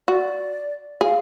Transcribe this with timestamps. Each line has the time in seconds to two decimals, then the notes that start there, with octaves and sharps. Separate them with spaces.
0.08 F#4 D5
1.01 G#4 F5